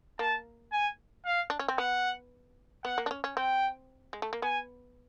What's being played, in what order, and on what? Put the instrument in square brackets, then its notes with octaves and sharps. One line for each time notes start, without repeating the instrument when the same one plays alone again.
[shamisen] A#3 [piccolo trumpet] A5
[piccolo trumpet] G#5
F5
[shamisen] D4
C#4
C4
[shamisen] B3 [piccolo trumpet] F#5
[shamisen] B3 [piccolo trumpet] F#5
[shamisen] A#3
D4
C#4
C#4
[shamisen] C4 [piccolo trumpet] G5
[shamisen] G#3
A3
A#3
[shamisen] B3 [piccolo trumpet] G#5